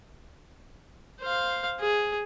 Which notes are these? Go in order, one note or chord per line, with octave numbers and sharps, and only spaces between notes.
C5 F5
G#4